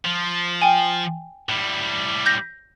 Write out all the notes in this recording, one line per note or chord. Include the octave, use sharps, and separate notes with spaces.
F3
G5 G#5
A2 G3
G6 A#6